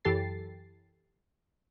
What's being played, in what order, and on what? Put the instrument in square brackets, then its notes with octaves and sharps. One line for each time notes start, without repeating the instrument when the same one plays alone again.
[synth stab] F#2 E3 G4 A4 A6 C7